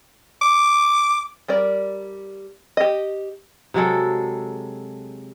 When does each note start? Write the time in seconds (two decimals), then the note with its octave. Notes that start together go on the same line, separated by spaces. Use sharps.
0.42 D6
1.48 G3 A#4 D5
2.77 G4 D#5
3.74 C3 F#3 G#3 A4